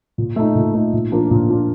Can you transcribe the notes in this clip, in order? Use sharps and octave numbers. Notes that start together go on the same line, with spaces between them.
A#2
A3 D#4
A#2
A3 D#4
A#2
F3 A#3 D4 F4
A#2
F3 A#3 D4 F4